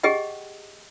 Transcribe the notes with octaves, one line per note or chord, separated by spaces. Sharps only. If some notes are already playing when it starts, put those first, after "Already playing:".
G4 G#4 D#5 F#5 G5